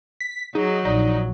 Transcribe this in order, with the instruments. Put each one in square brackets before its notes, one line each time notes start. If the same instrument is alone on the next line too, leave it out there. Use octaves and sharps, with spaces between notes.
[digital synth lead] B6
[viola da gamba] F#3 [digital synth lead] D#4 [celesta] G#4
[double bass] A#1 [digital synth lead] D#4 [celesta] D5